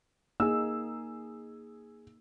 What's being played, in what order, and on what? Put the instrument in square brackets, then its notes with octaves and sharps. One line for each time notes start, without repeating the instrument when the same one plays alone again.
[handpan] A#3 D#4 [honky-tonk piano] G#4 E6